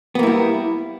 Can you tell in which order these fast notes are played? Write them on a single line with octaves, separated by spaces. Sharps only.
B3 A#3 E4 G3